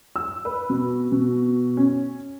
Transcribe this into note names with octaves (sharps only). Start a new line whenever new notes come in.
E6
B4
B2
B2
C#4